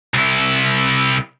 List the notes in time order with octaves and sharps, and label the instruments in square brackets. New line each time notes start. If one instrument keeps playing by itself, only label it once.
[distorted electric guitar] C2 E4